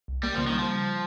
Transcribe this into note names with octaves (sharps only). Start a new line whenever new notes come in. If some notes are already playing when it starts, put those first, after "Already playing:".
C2
G3 A#3
C#3 F3
D#3
G3
F3